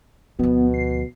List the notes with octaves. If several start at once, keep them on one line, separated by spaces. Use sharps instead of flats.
D2 B2 F3 B3
C7